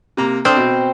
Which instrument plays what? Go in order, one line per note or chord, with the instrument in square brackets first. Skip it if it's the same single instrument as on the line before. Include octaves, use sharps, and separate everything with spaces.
[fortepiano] C3 A#3 A#5
[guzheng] C4 [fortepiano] D4 D#6 F6
[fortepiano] B2